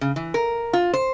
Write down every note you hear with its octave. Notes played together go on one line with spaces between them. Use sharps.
C#3
E3
A#4
F4
C5